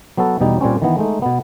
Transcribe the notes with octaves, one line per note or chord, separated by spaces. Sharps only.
F#3 B3 F#4 A4
E2 B2 G3 D#4
A#2 G3 C4 C#4
D#3 E3 B3
G#3 A3 D#4
B2 B3